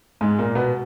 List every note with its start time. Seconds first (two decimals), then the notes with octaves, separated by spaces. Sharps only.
0.21 G#2 G#3
0.39 A#2 A#3
0.55 B2 B3